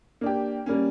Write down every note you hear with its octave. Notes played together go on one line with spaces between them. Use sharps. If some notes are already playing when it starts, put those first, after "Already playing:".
A#3 D4 G4
G3 A#3 C#4